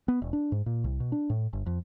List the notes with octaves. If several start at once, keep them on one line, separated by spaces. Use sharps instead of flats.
B3
E1
D4
G#2
A#2
C2
B2
D4
A2
G1
F2